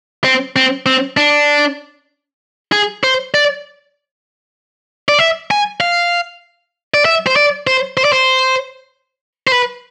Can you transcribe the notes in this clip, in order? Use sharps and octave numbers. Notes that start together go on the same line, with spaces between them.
C4
C4
C4
D4
G#4
C5
D5
D5
E5
G#5
F5
D5
E5
C5
D5
C5
C5
D5
C5
C5
B4